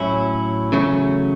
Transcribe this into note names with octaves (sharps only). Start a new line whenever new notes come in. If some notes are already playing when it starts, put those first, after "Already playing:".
Already playing: A2 F#3 C#4 E4
E2 C#3 F#3 A3 C#4